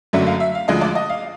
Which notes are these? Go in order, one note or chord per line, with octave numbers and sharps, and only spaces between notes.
F#1 F#2 D3 F#3 A3 E5
F5
E5
F5
D2 D3 F3 G#3 D#5
D5
D#5
F5